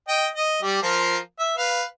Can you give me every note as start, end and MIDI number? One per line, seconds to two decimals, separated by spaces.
0.09 0.27 75
0.09 0.27 79
0.36 0.61 75
0.62 0.80 55
0.62 0.80 67
0.83 1.17 53
0.83 1.17 65
0.83 1.17 70
1.39 1.55 76
1.58 1.83 71
1.58 1.83 77